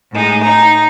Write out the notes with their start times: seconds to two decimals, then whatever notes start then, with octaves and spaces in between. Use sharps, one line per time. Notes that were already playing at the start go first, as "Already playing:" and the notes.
0.12 A2 G#3 D#4
0.44 D#4 A#5